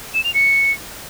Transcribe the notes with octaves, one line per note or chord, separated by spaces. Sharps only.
E7
F7
C#7